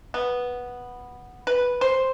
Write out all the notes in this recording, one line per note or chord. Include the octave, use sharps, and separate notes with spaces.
B3
B4
C5